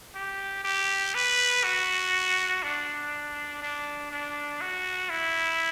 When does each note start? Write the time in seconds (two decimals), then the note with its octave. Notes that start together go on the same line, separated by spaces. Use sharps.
0.15 G4
0.64 G4
1.15 B4
1.64 F#4
2.63 D4
3.62 D4
4.11 D4
4.61 F#4
5.10 E4